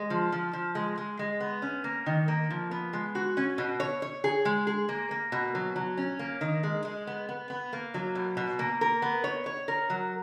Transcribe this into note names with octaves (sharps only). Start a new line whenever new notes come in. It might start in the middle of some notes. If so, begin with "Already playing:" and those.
Already playing: G#3
F3
F3
F3
G#3
G#3
G#3
B3
C#4
A#3
D#3
A#3
F3
B3
G#3
F#4
C#4
B2
C#5
C#5
G#4
G#3
G#4
A#3
A#3
B2
F#3
F#3
C#4
A#3
D#3
G#3
G#3
B3
B3
B3
A#3
F#3
B2
B2
A#3
A#4
B3
C#5
C#5
A#4
F#3